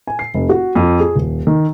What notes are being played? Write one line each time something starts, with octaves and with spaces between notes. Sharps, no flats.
G#5
C7
F1
F#4
F2
G#4
D#1
D#3